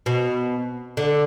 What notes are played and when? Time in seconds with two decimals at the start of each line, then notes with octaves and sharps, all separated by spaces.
0.06 B2
0.97 D3